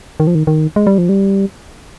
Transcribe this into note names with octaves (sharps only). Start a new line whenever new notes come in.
D#3
F3
D#3
D#3
G#3
G3
F3
G3